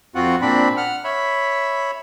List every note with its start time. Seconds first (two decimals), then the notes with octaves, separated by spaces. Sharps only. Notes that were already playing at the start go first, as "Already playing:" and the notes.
0.15 F2 C4 F4 F#4 F#5
0.42 A#2 C4 D4 B5
0.77 F#5 F6
1.04 C#5 E5 B5